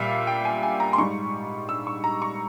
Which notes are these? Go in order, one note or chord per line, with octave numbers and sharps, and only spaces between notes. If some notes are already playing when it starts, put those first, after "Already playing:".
Already playing: A#2 G3 E5 F5
G5
G#5
G#5
A#5
C6
G#2 G3 C#6
E6
C#6
A#5
C#6